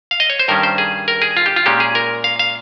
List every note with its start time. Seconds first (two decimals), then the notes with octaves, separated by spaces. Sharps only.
0.11 F5
0.20 D#5
0.30 C#5
0.39 C5
0.48 G2 D#3 G3 C#4 A#4
0.63 C5
0.78 G#4
1.08 A#4
1.22 G#4
1.37 F4
1.46 G4
1.56 F4
1.66 A#2 G#3 C#4 G4
1.80 G#4
1.95 A#4
2.24 F5
2.39 F5